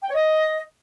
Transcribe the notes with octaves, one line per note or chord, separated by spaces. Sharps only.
G5
C#5
D#5